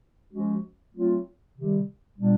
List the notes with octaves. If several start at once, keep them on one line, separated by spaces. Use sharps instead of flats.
F3 G#3 C#4 F#4
F#3 A3 C4 F4
C3 D#3 G3
A#2 G3 B3 D4